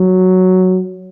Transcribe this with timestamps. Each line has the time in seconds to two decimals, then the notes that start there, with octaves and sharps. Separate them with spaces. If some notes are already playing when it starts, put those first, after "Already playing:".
Already playing: F#3